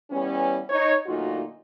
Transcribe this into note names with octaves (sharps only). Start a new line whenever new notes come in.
E3 G3 B3 C#4
D#4 C#5
D2 A#2 F#3 D#4 F4 F#4